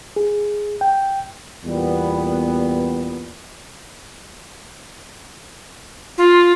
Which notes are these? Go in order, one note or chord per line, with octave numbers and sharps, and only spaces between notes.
G#4
G5
E2 A#2 G3 B3
F4